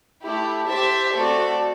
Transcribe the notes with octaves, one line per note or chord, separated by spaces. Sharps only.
A3 E4 G4
G4 C5 E5 A5
A3 C4 F#4 A4 D5